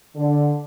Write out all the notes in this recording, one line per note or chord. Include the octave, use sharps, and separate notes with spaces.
D3